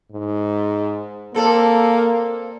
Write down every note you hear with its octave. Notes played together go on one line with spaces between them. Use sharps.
G#2
A#3 C4 A4 D5